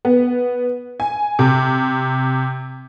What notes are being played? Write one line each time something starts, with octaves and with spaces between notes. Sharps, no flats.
B3
G#5
C3